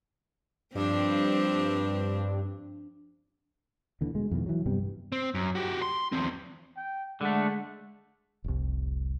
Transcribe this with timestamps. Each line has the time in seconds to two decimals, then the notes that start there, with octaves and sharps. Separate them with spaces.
0.75 G2 F3 C4 D4
4.01 D#2 D3 E3
4.15 B2 G#3
4.31 F2 B2 D#3 E3
4.46 E3 F#3
4.66 G2 C3 G3 B3
5.12 C4
5.34 F#2
5.55 F#4 G4
5.82 C6
6.12 E2 C4
6.77 G5
7.21 D3 G#3 A3 F#5
8.44 F1 C2